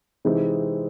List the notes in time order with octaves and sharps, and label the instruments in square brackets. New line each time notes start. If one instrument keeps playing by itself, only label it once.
[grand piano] C3 E3 G#3 C4 D#4